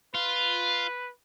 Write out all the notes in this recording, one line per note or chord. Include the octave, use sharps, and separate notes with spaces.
F4 B4